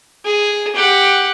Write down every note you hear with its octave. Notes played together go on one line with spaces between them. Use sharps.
G#4
G4 F#5